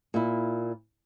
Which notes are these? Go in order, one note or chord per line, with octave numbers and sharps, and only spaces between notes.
A#2 E4